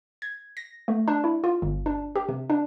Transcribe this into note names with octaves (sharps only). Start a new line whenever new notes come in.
G#6
A#6
A3
D4
E4
F4
G1
D4
G4
C3
D4